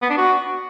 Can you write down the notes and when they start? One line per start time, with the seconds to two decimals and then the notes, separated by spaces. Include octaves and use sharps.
0.02 B3
0.10 D4
0.18 F#4